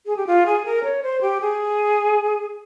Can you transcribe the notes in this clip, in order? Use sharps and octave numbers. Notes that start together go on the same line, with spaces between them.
G#4
G4
F4
G#4
A#4
C#5
C5
G4
G#4